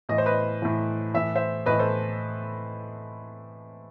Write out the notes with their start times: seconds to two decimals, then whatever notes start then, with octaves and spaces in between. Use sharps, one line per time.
0.09 A2 E3 D#5
0.18 C5
0.26 B4 D#5
0.62 A2 E3
1.14 A2 E3 E5
1.35 C5 E5
1.66 A2 E3 B4 D#5
1.79 A4 C5